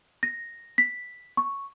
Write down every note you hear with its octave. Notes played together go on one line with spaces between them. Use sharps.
A#6
B6
C#6